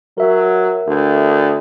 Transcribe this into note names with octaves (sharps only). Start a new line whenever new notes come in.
F#3 A#4 E5
D2